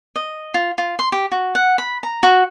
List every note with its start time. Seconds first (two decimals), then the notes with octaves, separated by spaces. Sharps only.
0.16 D#5
0.54 F4
0.78 F4
0.99 C6
1.12 G4
1.32 F#4
1.55 F#5
1.78 B5
2.03 A#5
2.23 F#4